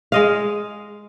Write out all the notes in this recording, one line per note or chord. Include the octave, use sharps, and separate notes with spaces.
G#3 D#5 F5